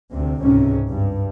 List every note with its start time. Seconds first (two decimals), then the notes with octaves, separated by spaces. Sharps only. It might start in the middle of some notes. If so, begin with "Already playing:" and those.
0.12 D2 C3
0.42 C#2 G#2 C3 C#4
0.90 G2